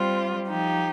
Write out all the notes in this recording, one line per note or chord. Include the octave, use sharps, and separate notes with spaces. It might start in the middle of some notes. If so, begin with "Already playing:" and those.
Already playing: G3 C4 F4
F3 D#4 G4